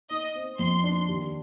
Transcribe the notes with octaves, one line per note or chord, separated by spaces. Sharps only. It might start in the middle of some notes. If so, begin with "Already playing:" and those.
D#4 D#5
C4
F2 C6
D4
D#2